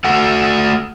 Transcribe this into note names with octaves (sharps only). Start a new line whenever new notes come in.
A3 F#4 A4 F#5